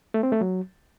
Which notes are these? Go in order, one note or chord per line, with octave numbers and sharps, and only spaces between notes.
A3
C4
A3
F#3